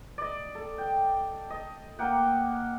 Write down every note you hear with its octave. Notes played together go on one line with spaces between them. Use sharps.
D5 D#5
A4
G5
D#5
A#3 F#5 G5